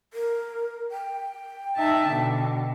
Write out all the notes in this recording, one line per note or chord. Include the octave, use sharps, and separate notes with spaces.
A#4
G5
D#4 E5 A5
B2 D3